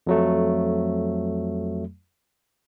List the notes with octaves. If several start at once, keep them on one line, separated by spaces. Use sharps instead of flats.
F2 F#3 A3